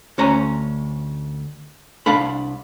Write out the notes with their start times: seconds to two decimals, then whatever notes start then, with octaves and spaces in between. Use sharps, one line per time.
0.18 D2 C#4 A#5
2.06 C2 D4 F5 B5